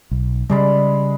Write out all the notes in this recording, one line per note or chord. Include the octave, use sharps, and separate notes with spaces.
B1
C#3 G3 G#3 D5 B5